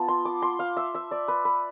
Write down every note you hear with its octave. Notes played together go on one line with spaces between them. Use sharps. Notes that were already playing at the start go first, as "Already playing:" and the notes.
Already playing: B3 F4 A5
C6
D6
C6
F5
E5
E5
D5
B4
B4